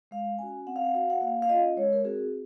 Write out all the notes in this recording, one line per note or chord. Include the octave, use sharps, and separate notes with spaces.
G#3 F5
C#4 F#4 G#5
C4 F#5
F5
F#5
F#4 F5
F#5
A#3 F5
F5
C#4 F4 D#5
G#3 C#5
A#4
C4 F#4 G#4